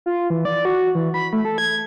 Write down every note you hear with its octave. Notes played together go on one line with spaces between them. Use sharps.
F4
E3
D5
F#4
E3
B5
A3
A4
G#6